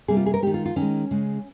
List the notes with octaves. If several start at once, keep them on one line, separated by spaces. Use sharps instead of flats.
C3 G3 A#3 G#4
F4
G#4
A#4
D#3 G#3 G4
F4
F4
D#3 C#4
G#3
C#3 G#3